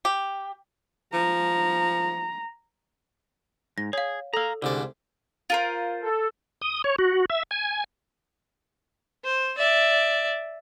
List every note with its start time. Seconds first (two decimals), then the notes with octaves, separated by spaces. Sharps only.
0.05 G4
1.14 F3 A#5
3.78 G#2 A#6
3.93 G#4 C#5 F5
4.33 A4 F5 A#5 E6
4.62 C2 G#2 D3 D5
5.50 F4 A#4 C5
6.03 A4
6.62 D#6
6.84 C#5
6.99 F#4
7.30 E5
7.51 G#5
9.24 C5
9.57 D5 E5